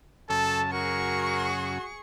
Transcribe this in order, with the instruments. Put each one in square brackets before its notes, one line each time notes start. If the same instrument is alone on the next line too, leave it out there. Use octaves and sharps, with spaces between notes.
[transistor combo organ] F#2 C#3 [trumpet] A4 [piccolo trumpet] A5
[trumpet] F#4 [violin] G#4 C#6 [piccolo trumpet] A#4